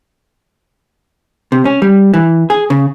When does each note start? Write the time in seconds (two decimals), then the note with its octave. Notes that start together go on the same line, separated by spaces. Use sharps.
1.52 C3
1.65 C#4
1.82 G3
2.14 E3
2.50 G#4
2.70 C#3